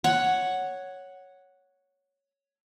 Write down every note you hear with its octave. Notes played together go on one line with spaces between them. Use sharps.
C#5 F#5